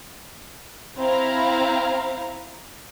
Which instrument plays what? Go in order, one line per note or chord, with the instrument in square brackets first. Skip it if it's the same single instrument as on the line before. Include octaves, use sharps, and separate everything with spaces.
[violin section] C4 E4 F5 A#5